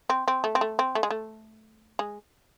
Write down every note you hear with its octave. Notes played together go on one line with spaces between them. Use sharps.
C4
C4
A3
C4
A3
C4
A3
G#3
A3
G#3